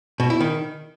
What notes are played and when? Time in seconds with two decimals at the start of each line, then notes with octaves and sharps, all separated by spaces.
0.20 B2
0.30 E4
0.40 D#3